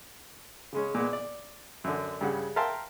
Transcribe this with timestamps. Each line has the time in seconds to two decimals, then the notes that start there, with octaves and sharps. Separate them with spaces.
0.73 C#3 G#3 C#4
0.95 A#2 G#3 B3
1.13 D5
1.84 F#2 D3
2.21 G2 C#3 F#5
2.56 A#4 E5 F5 G5 A5 C6